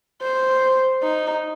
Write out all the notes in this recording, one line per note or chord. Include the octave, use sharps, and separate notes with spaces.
C5
D#4